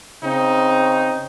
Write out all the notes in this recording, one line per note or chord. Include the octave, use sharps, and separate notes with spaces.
C#3 C4 D#4